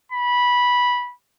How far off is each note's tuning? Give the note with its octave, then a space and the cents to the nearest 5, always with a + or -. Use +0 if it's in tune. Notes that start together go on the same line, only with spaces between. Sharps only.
B5 -10